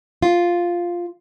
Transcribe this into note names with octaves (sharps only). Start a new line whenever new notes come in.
F4